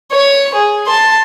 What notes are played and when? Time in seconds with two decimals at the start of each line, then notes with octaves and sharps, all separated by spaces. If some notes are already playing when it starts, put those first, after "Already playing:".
0.11 C#5 C#6
0.54 G#4
0.87 A5 C6